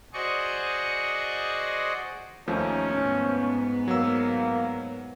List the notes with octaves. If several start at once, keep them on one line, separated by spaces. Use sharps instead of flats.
F#4 G#4 C5 D5 D#5 C#6
D#2 F3 A3 C#4 D#4
G#2 B3
F#3 A#3 E6